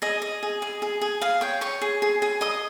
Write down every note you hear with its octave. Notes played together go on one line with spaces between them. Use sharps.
G#4 D#5
D#5
G#4
G#4
G#4
G#4
G#4 F5
C#5 G5
C#5 C#6
G#4
G#4
G#4
D#5 D#6